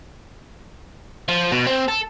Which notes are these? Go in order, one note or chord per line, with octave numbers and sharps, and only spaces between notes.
F3
B2
C4
A4